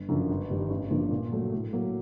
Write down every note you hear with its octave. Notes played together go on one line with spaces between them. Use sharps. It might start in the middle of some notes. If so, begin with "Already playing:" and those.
Already playing: G1
F#2 D3 F3
G1
G2 D#3 G3
A1
G2 D3 F3 A#3
A#2
F#3 A3
A2
F#3 A#3